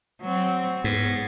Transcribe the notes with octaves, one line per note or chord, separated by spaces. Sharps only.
F#3 C4
G#2 B3